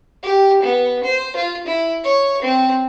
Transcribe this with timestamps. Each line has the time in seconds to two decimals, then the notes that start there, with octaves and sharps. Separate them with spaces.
0.23 G4
0.63 B3
1.04 C5
1.36 F4
1.67 E4
2.04 C#5
2.42 C4